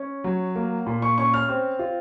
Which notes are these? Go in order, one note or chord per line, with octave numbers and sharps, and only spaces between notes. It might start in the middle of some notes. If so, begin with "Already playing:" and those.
Already playing: C#4
F#3
A#3
A#2
C#6
C#4 C#6
F6
C4
F4